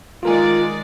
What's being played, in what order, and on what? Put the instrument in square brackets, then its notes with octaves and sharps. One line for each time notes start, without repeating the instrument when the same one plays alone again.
[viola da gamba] D#3 G#3 D5 [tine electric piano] F4 A#4 G#5